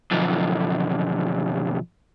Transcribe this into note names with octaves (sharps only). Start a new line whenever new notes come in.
B1 F2